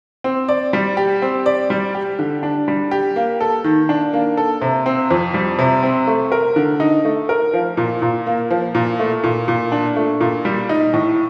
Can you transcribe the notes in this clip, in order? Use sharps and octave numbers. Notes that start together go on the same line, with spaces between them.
C4
D5
G3
G4
C4
D5
G3
G4
D3
D4
G3
G4
A#3
A4
D#3
D4
A#3
A4
C3
C4
F2
G3
C3
C4
A3
A#4
D3
D#4
A3
A#4
F3
A#2
A#2
A#3
F3
A#2
A3
A#2
A#2
D4
A3
A#2
G3
D#4
A2